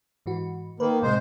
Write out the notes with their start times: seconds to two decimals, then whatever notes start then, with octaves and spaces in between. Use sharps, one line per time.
0.26 G#2 E3 F#4
0.80 D#3 A#3 B4
1.02 A2 C3 G#3 C5